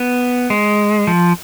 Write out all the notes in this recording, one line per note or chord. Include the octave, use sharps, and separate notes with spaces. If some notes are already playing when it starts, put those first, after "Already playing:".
Already playing: B3
G#3
F3